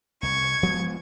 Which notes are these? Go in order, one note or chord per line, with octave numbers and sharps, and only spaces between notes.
C2 C#6 G#6
F3 G#3 B3